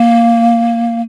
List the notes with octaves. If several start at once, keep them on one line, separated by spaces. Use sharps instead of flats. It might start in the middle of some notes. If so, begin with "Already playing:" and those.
Already playing: A#3